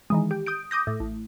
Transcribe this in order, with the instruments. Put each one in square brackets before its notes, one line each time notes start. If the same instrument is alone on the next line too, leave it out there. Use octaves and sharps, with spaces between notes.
[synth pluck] D#3 E3 G#3
G4
D#6 G6 D7
D6 D#6 G6 A#6
A2
A1